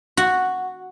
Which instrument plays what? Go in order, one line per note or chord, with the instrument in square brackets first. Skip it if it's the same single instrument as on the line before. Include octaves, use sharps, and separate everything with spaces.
[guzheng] F#4